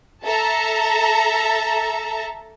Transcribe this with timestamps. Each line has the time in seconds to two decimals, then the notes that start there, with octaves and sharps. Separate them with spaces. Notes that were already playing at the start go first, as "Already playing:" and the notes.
0.24 A4 E5 A5 A#5